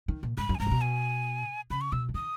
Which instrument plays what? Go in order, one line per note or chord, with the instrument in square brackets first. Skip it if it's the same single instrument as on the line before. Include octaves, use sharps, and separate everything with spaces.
[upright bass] D#3
A#2
[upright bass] G#2 [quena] B5
[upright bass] F#2
[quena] G#5
[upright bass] G#2 [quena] A#5
[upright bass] A#2
B2
[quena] G#5
[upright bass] C#3 [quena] B5
[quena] C#6
[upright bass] B2 [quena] E6
[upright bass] E3
[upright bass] D#3 [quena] D#6